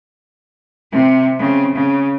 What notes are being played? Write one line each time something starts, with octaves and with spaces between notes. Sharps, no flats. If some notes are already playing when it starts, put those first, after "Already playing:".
C3 C4
C#3 C4
C#3